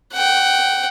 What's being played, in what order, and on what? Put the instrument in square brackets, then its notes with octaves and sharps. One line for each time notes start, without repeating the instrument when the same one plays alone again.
[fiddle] F#5 G5